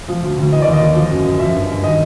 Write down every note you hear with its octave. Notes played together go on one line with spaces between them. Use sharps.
F3
D2
D2
E3 D#5
D#2 D5
D#5
D#2
F3
F#2
F#2
F3 E5
G2
G2
D#3 D#5